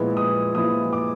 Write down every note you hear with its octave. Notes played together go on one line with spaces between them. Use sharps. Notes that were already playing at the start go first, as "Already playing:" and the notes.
Already playing: A#2 F3 G#3 B3 E4
D#6
A#2 F3 G#3 B3 E4 D#6
D6